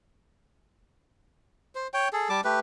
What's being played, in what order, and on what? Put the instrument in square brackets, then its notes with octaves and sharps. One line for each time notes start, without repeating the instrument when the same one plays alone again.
[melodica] C5
C#5 G5
G#4 A4
G3 A5 D6
A3 G4 B4